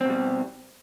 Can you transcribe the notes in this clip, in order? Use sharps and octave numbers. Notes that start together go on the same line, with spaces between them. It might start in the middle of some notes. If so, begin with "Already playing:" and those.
B2 G3 C4